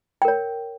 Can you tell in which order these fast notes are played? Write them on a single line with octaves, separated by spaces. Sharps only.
G5 A#4 C#5